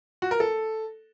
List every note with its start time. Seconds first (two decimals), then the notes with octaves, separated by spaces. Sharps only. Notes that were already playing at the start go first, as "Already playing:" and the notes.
0.22 F#4
0.31 A#4
0.40 A4